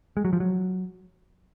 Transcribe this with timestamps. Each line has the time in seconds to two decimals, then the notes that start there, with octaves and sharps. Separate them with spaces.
0.17 G#3
0.25 F#3
0.33 F3
0.40 F#3